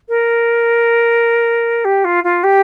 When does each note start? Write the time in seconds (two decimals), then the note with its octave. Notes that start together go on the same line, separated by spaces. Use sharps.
0.09 A#4
1.84 G4
2.04 F4
2.24 F4
2.43 G4